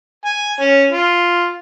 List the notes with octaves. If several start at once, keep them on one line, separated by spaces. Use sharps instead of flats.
G#5
C#4
F4